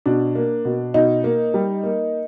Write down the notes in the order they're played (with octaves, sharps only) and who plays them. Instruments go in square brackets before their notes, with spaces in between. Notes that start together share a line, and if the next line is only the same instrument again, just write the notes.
[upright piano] B2 D4
A#3
B2
B2 D#4
A#3
G3
A#3